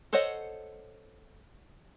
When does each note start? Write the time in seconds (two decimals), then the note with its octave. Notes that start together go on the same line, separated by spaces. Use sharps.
0.13 A4 C5 C#5 D#5 F#5